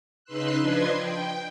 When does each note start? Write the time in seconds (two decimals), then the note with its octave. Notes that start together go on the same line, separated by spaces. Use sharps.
0.24 C#3 D#4 B4 C6 E6 F#6
0.57 F3 D4 B4 D#5 C6 G#6
0.94 G5